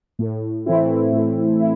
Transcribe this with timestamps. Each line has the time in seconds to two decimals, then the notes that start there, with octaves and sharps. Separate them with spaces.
0.19 A2
0.66 E3 A3 C4 E4
1.13 A2
1.60 E4